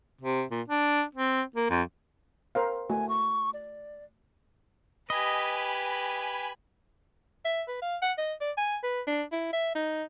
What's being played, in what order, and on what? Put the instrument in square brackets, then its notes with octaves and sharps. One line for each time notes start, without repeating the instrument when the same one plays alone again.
[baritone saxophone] C3
A#2
D4
C4
A#3
F2
[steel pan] A#4 C5 F5
[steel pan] A3 F#4 [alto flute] G#5
[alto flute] C#6
D5
[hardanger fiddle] G4 B4 [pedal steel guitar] D#5 [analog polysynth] G#5 B5
[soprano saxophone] E5
B4
F5
F#5
D#5
D5
G#5
B4
D4
E4
E5
D#4